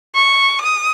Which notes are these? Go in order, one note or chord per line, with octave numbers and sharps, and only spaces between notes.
C#6
D#6